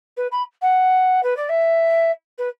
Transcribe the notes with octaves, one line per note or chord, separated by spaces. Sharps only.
B4
B5
F#5
B4
D5
E5
B4